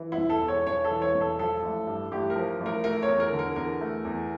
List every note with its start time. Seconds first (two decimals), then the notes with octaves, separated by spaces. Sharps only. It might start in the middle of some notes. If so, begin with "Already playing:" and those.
Already playing: E3
0.12 E4
0.17 E1
0.30 A4
0.41 E2
0.48 C#5
0.66 E1 C#5
0.84 A4
0.90 E3
1.02 C#5
1.15 E1
1.21 A4
1.39 F3 A4
1.63 A1
1.87 G2
2.11 A1 G4
2.30 A#4
2.36 F3
2.60 A1
2.66 A#4
2.84 A3 A#4
3.03 C#5
3.08 E2
3.20 A#4
3.32 D3
3.39 A#4
3.56 E2 A#4
3.81 A3
4.05 E2